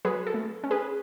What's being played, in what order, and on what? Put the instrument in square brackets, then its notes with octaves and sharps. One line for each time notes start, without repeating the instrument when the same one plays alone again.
[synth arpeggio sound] F#3 G#4 B4
A4
A3
C#4
G#4 B4